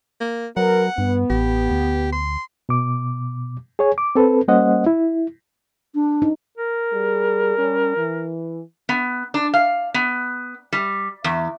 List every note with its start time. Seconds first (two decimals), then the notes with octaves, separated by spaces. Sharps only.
0.21 A#3
0.57 F#3 B3 A#4 F#5
0.98 G2 B3
1.30 A1 G4
1.70 D2
2.13 C6
2.69 B2 D6
3.79 G#4 C#5 G#5
3.98 D6
4.15 C4 A4 B4
4.48 G3 A#3 C#4 C5 D#5 F#5
4.86 E4
5.95 D4
6.22 D#4
6.58 A#4
6.93 G3 G#4
7.57 G3 C#4
7.97 E3
8.89 B3
9.34 D4
9.54 F5
9.94 B3
10.73 G3
11.24 E2